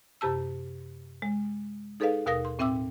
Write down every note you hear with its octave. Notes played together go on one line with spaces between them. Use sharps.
F#2 C3 G4 A5 E6
G#3
D#4 G#4 A4 B4 D5 F5
D#2 B2 A#4 F5 D#6 A#6
C6
A2 C4 E5 G5 D6 E6